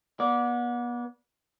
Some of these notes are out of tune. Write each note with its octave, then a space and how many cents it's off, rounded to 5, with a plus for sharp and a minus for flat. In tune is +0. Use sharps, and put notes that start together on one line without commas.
B3 -35 D5 -10